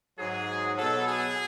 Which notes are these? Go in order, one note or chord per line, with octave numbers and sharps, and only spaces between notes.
G#2 F#3 G#4
B2 F#3 A4
G#4